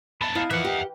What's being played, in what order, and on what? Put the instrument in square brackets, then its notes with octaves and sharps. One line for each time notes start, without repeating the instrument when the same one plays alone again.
[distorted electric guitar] B3 A4 [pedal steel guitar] E5 B5
[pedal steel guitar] D#4 F5 [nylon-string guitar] E4
[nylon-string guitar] E3 F3 [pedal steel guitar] D#4 A#4 F#6 [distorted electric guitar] E5 F#5
[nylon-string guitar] G4